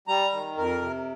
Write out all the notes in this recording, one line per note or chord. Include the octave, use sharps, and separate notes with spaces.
G3 A#5
D#3
F2 A#4
C3